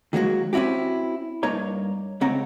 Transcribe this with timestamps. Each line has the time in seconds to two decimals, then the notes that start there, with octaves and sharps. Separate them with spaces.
0.13 D#3 F#3 G#3 A#3 F#4
0.53 C4 C#4 E4 F#4 G4
1.43 G2 A#3 D#4 C#5 A#5
2.21 C#2 C#3 C4 F#5 A#5